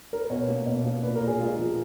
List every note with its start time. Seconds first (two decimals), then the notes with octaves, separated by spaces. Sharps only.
0.13 A#4
0.21 B4
0.30 B2 C#5
0.48 A#3
0.66 B2
0.85 A#3
1.03 A#2 B4
1.15 A#4
1.22 A#2
1.28 G#4
1.40 G#3 F4
1.58 F3